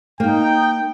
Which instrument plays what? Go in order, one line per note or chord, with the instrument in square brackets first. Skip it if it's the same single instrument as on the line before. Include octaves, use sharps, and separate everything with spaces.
[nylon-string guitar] A#3 [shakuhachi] D#4 [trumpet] G5